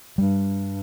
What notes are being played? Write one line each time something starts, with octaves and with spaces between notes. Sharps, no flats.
G2 G3